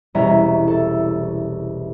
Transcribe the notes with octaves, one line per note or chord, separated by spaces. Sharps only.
E1 C2 C#4 E5 A#5 E7
A4